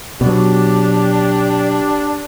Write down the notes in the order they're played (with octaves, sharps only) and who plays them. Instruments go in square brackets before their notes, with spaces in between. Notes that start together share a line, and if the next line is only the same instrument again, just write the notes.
[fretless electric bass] B2 F#3 [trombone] D4 [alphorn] G4